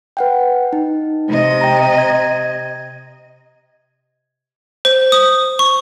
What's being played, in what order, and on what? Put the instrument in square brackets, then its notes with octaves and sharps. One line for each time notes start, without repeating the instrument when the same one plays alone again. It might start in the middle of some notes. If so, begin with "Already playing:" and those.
[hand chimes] B4 F#5 G5
D#4
[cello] C3 D#5
[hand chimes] G5 A#5
G#6
[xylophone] C5
D#6
C#6